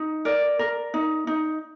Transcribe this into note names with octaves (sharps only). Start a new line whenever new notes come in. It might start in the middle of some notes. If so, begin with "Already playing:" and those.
Already playing: D#4
A#4 D5
A#4
D#4
D#4